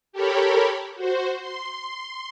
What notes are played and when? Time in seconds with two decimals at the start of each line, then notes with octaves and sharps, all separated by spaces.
0.13 G4 A4 A#4 C#5 B5
0.95 F#4 C5
1.39 C6